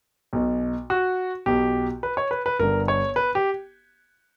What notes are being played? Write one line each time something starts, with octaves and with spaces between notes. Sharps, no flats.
B1 B2
F#4
B1 B2 G4
B4
C#5
B4
B4
G1 G2 D3 A#4
C#5
B4
G4